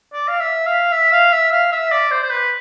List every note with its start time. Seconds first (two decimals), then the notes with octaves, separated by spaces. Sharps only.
0.13 D5
0.28 F5
0.40 E5
0.66 F5
0.92 E5
1.12 F5
1.32 E5
1.51 F5
1.72 E5
1.92 D5
2.11 C5
2.23 C5
2.30 B4